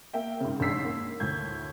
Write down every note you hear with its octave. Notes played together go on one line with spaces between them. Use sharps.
A#3 E5 G5
G#2 C#3
A1 G#2 D4 E6 B6 C7
A#3
D2 A2 G6 G#6